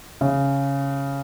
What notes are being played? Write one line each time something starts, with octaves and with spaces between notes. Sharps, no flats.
C#3